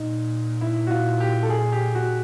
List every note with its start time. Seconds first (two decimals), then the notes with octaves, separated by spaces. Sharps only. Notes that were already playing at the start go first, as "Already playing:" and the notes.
Already playing: A#2 D#4
0.61 E4
0.87 F#4
0.91 F4
1.20 G4
1.43 A4
1.50 G#4
1.72 G4
1.95 F#4